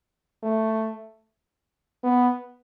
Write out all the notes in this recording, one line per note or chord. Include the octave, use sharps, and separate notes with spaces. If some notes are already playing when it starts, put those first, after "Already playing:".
A3
B3